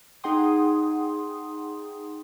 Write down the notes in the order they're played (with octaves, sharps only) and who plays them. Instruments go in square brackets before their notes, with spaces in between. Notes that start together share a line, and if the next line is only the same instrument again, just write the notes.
[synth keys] D#4 G#4 F#5 G5 C6 D#6